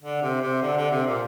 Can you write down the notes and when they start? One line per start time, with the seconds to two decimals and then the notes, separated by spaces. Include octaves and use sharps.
0.02 D3
0.22 C3
0.41 C3
0.62 D3
0.77 D3
0.91 C3
1.06 A#2